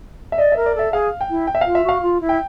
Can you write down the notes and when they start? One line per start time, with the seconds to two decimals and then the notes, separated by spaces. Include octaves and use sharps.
0.32 E5
0.38 D5 D#5
0.52 A#4 E5
0.66 D5
0.75 A4 E5
0.92 G#4 F5
1.21 G5
1.30 E4
1.47 G5
1.55 E5
1.61 F4 F5
1.75 E5
1.84 F#4 F5
2.02 F4
2.21 E4
2.29 G5